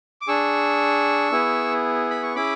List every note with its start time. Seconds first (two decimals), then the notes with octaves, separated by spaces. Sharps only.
0.21 D6
0.28 D4 G#4 C#6 E6
1.32 B3 E4 G#4
2.10 B5
2.23 C#6
2.35 C#4 E4 G#4 B5 D6